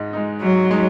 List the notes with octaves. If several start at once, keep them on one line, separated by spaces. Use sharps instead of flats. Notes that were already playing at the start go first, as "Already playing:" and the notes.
Already playing: G#2 G#3 D#4
G#3 D#4
G#2 F#3
G#3 D#4